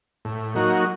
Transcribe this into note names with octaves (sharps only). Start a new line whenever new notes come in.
A2
F#3 A#3 D#4 F#4